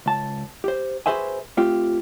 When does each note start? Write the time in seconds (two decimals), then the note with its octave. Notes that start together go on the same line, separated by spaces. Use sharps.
0.06 C#2 A5
0.64 G4 C5
1.06 F#4 G#4 B4 C5 E5 G#5
1.57 A3 C4 F4 G4